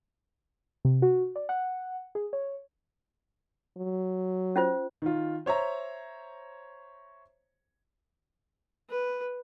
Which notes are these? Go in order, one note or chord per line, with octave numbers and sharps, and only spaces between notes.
C3
F#4
D5
F#5
G#4
C#5
F#3
C#4 F4 C5
D#3 F4
C5 C#5 E5 A#5
B4